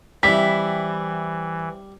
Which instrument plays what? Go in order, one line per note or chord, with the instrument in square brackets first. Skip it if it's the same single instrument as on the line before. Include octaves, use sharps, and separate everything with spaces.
[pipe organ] E3 [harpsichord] G3 [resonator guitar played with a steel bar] C4 E4 [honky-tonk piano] B6